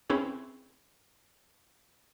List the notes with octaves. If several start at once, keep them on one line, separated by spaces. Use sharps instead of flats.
C4 C#4 E4 G#4 B4 C#5